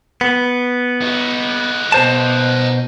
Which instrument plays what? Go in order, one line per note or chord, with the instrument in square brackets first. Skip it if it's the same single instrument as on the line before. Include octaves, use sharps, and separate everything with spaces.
[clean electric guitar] B3
[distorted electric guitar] D#4 F#4
[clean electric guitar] B2 C5 A5